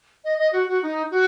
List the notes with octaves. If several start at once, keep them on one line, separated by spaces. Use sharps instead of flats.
D#5
D#5
F#4
F#4
D#4
F#4